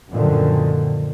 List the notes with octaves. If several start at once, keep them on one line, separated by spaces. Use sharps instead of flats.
F#2 A#2 D3 D#3 F3